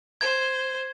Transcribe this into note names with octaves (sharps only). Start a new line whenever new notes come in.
C5 G#6